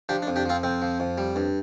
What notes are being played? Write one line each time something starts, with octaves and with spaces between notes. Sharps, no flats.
F3 D4 G4
D4
F2
D4 G4
F3 C4 F4
F2 C4
F3
F2
G3
G2